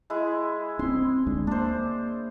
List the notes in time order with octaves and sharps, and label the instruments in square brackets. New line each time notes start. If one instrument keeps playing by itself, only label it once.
[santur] G#3 E4 G#4
[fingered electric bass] C4 D4 [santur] C6
[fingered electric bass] D2 G#3 D4
[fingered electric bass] A#3 [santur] D4 C5